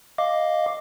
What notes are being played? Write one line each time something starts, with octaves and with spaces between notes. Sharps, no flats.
D#5 F5 D6